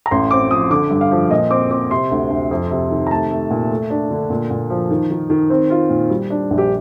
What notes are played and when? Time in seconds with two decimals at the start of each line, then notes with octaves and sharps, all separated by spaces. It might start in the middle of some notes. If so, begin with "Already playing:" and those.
0.06 A#5
0.11 A1 C6
0.31 C4 D6
0.51 F3 D#6
0.70 D3 D6
0.90 G2
1.01 F5
1.11 F3
1.30 A#2 D#5
1.50 C4 D6
1.70 C4 D6
1.91 C3 C6
2.11 D2
2.30 D2
2.51 F2
2.71 C3
2.91 D#3
3.07 A#5
3.11 A3 A5
3.31 A3
3.51 A#2
3.70 A3
3.90 D4
4.11 D3
4.30 A#2
4.50 A#2
4.70 F3
4.90 D#3
5.10 D#3
5.30 D#3
5.50 C4 C5
5.70 F4
5.90 A#2
6.10 G3
6.30 D4
6.50 A#1
6.58 G4